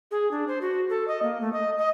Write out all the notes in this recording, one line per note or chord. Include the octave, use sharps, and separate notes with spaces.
G#4
D4
C5
F#4
A4
D#5
A#3
A3
D#5
D#5